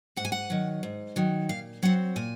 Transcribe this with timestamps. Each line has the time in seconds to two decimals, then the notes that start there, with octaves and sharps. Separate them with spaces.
0.16 G#2 F#5
0.25 G#5
0.32 F#5
0.50 D#3 F#3
0.83 G#2
1.16 D#3 F#3
1.49 A#2 F5
1.83 F#3 C4 F#5
2.16 A#2 G#5